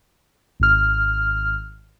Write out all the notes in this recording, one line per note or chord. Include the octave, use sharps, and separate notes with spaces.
G#1 F6